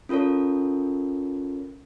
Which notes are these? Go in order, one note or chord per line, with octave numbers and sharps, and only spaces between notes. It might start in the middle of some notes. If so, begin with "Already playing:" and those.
C#4 F4 A4 A#4 C#5